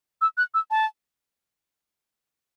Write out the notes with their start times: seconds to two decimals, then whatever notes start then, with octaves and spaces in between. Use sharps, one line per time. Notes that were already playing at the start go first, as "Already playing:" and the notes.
0.21 E6
0.37 F#6
0.54 E6
0.71 A5